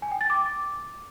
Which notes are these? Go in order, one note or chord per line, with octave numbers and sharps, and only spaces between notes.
G#5
G5
A6
D6